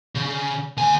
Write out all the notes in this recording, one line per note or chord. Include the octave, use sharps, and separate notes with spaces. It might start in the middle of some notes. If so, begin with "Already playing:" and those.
C#3
D2 G#5